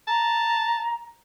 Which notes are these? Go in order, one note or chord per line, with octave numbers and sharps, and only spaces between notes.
A5 A#5